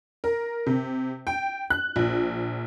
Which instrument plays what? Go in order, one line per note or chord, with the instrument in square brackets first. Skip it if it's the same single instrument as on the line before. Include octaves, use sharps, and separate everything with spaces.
[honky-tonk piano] A#4
C3
G5
F#6
A#1